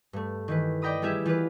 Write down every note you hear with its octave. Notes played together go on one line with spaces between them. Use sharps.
G2 A3
D#3 E3 B4
D5 D#5 G5 A#5 B5 D#6
G3 B3 E4 G4 G#4 E5
E3 F4 G4 B4